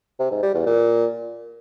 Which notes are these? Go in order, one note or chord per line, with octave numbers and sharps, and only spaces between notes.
C3
G#2
G3
E2
A#2